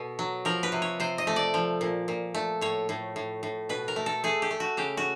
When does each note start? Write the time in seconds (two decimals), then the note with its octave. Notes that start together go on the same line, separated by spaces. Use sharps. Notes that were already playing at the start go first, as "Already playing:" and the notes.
Already playing: B2 A4
0.19 F#3
0.45 F3 A#4
0.63 B4
0.72 C3
0.82 C#5
1.00 C3 C5
1.18 D#5
1.27 A3
1.36 D5
1.54 F3
1.81 A#2
2.08 A#2
2.34 A3
2.61 A2 C#5
2.89 A2
3.16 A2
3.43 A2
3.69 B2 B4
3.88 A#4
3.96 A3
4.06 A4
4.24 A3 G#4
4.42 G4
4.51 A3
4.60 F#4
4.77 C#3 G4
4.97 F#4